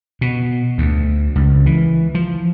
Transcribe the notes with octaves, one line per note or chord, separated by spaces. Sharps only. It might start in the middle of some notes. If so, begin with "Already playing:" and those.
B2
D2
C#2
E3
F3